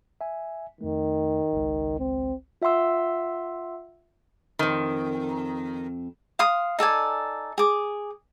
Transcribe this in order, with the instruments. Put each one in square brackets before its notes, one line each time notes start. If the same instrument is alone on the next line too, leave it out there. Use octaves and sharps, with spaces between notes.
[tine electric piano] E5 G#5
[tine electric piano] F2 A3 [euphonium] D#3
[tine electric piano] G#1 C#2
[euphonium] C4
[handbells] F4 E5 F#5 C6 E6
[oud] F2 C4 [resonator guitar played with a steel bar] D#3
[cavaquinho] F5 C6 D#6
D#4 A4 D5 G#5
G#4 D6